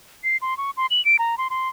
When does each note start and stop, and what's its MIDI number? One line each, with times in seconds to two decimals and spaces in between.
0.24 0.37 96
0.42 0.56 84
0.58 0.71 85
0.77 0.86 84
0.91 1.03 102
1.05 1.17 98
1.19 1.38 82
1.38 1.48 84
1.50 1.69 84